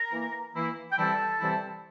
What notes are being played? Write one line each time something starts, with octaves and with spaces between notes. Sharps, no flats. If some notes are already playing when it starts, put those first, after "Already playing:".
Already playing: A#4 A#5
E3 A#3 E4
E3 A#3 E4
G5
C3 E3 G3 C4 E4 A4 A5
C3 E3 G3 C4 E4